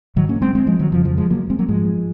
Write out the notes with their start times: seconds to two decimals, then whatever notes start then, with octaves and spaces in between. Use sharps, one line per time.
0.16 G#2 D#3 F#3
0.29 A#3 C#4
0.42 G#3 C4
0.55 G#3 C4
0.67 F3 G#3
0.79 D#3 F#3
0.92 F2 C#3 F3
1.05 F3
1.18 F3 G#3
1.30 F#3 A#3
1.50 G#3 C4
1.59 F#3 A#3
1.68 G#2 F3 G#3